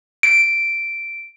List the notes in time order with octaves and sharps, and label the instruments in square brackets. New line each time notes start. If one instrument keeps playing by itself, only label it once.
[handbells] D7